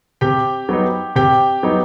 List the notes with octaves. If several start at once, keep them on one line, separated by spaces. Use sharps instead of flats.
C3 G4 G5
F#3 B3 D#4
C3 G4 G5
F#3 B3 D#4